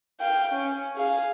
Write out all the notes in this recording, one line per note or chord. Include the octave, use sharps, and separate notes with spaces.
F5 G5
C#4
G#4 F5